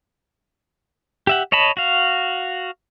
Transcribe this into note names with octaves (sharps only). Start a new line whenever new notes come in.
G4 E5 F#5
C#5 D#5 A5 B5
F#4 F5